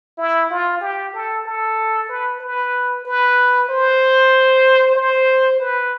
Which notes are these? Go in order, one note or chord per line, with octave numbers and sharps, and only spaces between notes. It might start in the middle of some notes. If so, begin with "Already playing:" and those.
E4
F4
G4
A4
A4
B4
B4
B4
C5
C5
B4